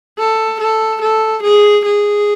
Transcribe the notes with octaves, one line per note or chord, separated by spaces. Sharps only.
A4
A4
A4
G#4
G#4